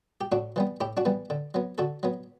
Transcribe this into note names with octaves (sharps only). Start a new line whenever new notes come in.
G4
A2 D4 F#4
E3 G3 B3
A2 E4 G4
D4 F#4
E3 G3 B3
D3
F#3 B3
D3 F#4 A4
F#3 B3